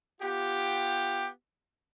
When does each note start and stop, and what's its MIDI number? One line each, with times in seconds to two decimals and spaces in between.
0.21 1.28 59
0.21 1.28 65
0.21 1.28 67